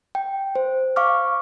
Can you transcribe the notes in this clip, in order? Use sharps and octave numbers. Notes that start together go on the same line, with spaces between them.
G5
C5
F5 C#6 D6 F6